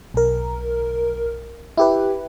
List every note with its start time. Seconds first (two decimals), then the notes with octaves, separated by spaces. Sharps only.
0.14 B1 A#4
1.78 E4 G4 B4